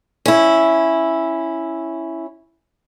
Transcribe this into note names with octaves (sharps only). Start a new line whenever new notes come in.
C#4 E4